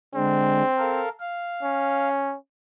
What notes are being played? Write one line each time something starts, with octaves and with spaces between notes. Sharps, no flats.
D3 G#3 C4 D4
A4 A#4 F5
F5
C#4